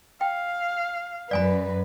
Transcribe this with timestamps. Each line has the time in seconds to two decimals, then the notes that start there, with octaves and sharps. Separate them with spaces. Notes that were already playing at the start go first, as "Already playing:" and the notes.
0.21 F5 G5
1.31 F#2 B4 D5 G#5 B5